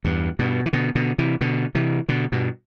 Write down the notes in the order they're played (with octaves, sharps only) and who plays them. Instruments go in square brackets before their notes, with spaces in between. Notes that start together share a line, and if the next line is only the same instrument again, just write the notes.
[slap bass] E2 G2
G2 B2
E3
B2 D3
B2 D3
C3 E3
B2 D3
C3 E3
B2 D3
G2 B2